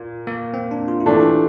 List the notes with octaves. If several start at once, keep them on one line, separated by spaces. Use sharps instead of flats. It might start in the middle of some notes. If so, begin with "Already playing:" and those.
Already playing: A#2
A#3
C4
D4
F4
E4
E3 A3 D4 F4
G4